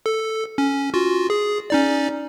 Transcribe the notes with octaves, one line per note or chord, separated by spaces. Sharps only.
A4
C#4
F4 F#4
G#4
C#4 D#4 D5